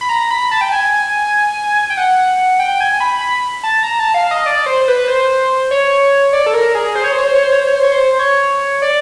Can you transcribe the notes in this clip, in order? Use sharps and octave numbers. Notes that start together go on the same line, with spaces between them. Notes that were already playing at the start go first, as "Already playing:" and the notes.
B5
A#5
B5
A5
G5
G#5
G5
F#5
G5
G#5
B5
B5
A5
A#5
A5
F5
D#5
D5
C5
C5
B4
C5
C#5
D5
A4
A#4
G#4
C5
C#5
C5
C#5
C5
C#5
C5
C#5
C5
C#5
C5
C#5
C5
C#5
D5